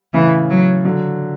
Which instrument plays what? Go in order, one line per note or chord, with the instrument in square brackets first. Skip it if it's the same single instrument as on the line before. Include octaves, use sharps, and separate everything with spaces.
[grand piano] A2 C#3 [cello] E3
[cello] F#3
[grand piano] D3 F#3